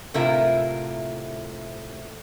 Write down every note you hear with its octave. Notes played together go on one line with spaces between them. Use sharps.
A2 C3 E4 F4 A#4 E5